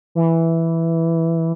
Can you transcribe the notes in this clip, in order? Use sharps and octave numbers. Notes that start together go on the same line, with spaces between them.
E3